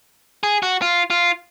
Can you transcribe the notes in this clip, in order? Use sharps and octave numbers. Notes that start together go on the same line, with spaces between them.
G#4
F#4
F4
F4